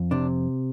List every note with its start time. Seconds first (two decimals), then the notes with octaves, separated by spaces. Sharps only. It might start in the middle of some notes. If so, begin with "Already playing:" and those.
Already playing: F2
0.11 C3 D4